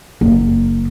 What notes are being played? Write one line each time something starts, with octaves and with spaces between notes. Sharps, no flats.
F#1